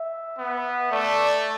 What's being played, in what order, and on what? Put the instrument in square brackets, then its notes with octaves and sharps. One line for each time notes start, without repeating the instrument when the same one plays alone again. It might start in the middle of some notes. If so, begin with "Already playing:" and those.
Already playing: [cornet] E5
[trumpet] B3
[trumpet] A3 [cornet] D5